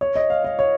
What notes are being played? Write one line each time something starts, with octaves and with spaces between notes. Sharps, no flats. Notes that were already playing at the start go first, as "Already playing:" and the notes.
C#5
D#5
F5
D#5
C#5